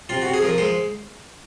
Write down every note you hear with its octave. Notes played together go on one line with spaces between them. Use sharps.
C3 F4
C3 F#4
G#4
F3 A#4
G#3 C5